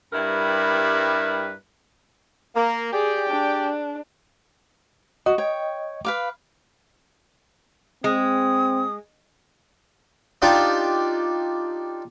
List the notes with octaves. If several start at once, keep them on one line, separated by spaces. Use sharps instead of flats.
G2 G3 E4 A#4 B4
A#3
G4 G#4 D5 G5
D4
F#4 D#5
C#5 G5
B4 F5 D6
G#3 C4 D#6
D4 D#4 F4 G4